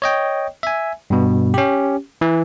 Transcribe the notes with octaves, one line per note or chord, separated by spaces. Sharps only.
C#5 D#5 G5
E5 G#5
G2 B2
C#4 G4
E3